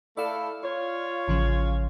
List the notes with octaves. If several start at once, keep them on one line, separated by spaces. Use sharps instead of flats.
A3 E4 A4 D5 F5
F4 C#5
A1 C#3 F3